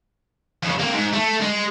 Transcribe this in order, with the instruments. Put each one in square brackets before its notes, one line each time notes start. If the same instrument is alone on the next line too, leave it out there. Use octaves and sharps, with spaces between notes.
[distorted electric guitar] F2 C#3
A#3 C4
G#2
A3
G#3